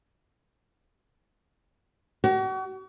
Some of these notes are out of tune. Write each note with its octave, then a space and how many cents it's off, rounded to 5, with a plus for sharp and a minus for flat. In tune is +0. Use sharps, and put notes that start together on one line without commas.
F#4 +40